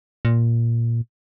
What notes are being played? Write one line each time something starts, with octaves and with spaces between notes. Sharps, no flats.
A#2